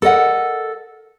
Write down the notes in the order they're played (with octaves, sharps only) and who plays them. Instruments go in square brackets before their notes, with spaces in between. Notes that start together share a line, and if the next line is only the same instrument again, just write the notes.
[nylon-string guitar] A4 A#4 D#5 F#5